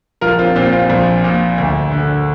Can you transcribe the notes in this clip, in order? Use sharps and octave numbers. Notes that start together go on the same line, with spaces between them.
A#1 F4 A#4
C4 F4
A#2 C4 F4
C4 F4
A#1
A#2
D2
D3